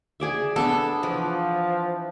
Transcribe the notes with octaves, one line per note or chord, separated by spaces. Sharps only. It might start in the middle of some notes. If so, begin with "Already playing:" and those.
G#4 D5 E5
B3 D4 A4
E3 F3